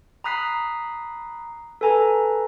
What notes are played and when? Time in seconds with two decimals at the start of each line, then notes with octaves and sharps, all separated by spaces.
0.24 A#5 B5 D#6 F#6 B6 C7
1.81 A4 B4 G#5 A#5